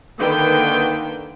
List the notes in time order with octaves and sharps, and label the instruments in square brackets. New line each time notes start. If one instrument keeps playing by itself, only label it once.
[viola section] D3 D#3 A#3 B4 G5